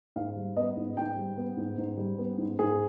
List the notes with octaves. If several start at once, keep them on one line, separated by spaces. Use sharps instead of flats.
G#2 F5
G3
B3 D#5
G#2
G#2 G5
G3
B3
G#2
G#2
G3
B3
G#2
G#2 G#4